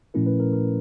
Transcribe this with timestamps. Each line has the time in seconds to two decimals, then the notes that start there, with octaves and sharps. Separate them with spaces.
0.14 A#2 F3 A3 C#4 E4 A#4
0.26 B4
0.40 A#4
0.53 A#4